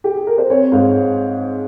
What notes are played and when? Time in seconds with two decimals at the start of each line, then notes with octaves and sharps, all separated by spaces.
0.04 G4
0.16 G#4
0.27 A#4
0.38 C5
0.50 C4 C#5
0.72 G#2 F5